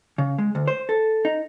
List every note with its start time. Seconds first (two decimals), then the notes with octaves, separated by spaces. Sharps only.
0.18 C#3
0.39 G#3
0.55 D2
0.68 C5
0.89 A4
1.25 D#4